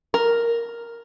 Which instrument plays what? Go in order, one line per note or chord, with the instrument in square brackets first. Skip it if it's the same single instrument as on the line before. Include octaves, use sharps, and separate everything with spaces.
[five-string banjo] A#4